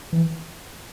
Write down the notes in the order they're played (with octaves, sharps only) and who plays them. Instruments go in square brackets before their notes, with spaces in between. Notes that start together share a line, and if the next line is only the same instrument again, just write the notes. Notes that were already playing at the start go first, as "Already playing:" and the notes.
[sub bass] E3